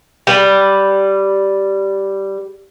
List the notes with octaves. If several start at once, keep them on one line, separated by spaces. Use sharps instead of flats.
G3 B4